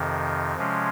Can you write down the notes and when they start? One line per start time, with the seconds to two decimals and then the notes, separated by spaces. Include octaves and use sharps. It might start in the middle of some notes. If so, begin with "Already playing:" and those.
Already playing: F2 C3 D#3
0.57 C3 F3 G#3 C#4